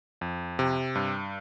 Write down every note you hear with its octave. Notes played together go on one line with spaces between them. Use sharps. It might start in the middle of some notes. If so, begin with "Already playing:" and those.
F2
C3
G2